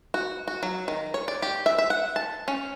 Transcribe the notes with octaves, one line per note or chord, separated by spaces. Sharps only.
F#4
F#4
F#3
D#3
C#5
D5
G4
E5
E5
F#5
A5
C#4